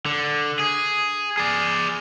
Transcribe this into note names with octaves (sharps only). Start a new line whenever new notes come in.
D3
G#4
G#4 D5